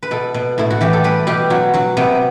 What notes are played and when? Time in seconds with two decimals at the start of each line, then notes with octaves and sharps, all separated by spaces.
0.03 B4
0.11 B2 A4
0.34 B2
0.58 A2 E4
0.70 F#4
0.81 E3 G4
0.93 A4
1.04 G3 B4
1.27 B2 G4
1.50 F#3 F#4
1.74 F#3 F#4
1.97 C3 B3